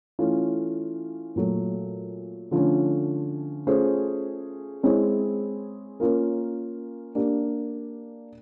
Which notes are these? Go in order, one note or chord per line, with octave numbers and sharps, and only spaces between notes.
E3 A3 C#4 F4
A#2 F#3 A3
D3 F3 A3 C#4
A3 C#4 F4 G#4 C5
G#3 C4 E4 G#4 C#5
A#3 C#4 F4 A#4
A#3 D4 G4